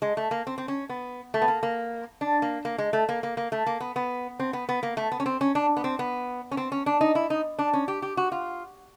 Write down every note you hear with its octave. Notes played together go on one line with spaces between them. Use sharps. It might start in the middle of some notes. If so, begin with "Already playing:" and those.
G#3
A3
A#3
C4
C4
C#4
B3
A3
B3
A#3
A#3
D4
A#3
A#3
G#3
A3
A#3
A#3
A#3
A3
A#3
B3
B3
C4
B3
B3
A#3
A3
B3
C#4
C4
C#4
D4
B3
C4
B3
C#4
C4
C#4
D4
D#4
E4
D#4
D4
C#4
G4
G4
F#4
F4